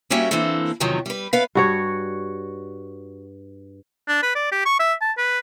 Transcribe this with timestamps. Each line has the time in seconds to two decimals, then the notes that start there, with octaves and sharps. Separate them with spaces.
0.10 G3 A#3 C#4 F#4 E5 G5
0.31 E3 A#3 C4 D4 A4
0.80 E2 C3 D#3 F3 F#3
1.06 G3 B4
1.33 B3 B4 F5
1.55 G2 F#4 C#5
4.08 D4
4.23 B4
4.35 D5
4.52 G4
4.66 C#6
4.80 E5
5.02 A5
5.18 B4